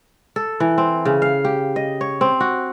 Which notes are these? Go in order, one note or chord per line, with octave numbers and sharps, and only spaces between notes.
A4
E3
C4
C#3
F5
G4
D#5
C#5
C4
F#4